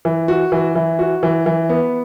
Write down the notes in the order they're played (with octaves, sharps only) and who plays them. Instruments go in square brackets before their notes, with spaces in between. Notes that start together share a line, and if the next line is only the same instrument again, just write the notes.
[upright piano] E3
F#4
E3
E3
F#4
E3
E3
B3